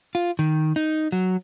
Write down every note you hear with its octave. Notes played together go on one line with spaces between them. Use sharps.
F4
D#3
D#4
F#3